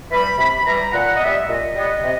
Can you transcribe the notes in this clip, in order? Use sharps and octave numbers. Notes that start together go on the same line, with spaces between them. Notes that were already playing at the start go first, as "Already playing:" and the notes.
E3 G3 B5
C3 B5
E3 G3 A#5
A#2 F#5
D#5
G3 B3 E5
A#2 D#5
G3 B3
C3